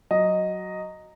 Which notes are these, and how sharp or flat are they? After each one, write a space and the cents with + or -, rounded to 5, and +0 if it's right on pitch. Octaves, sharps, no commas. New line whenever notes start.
F#3 +0 D#5 +0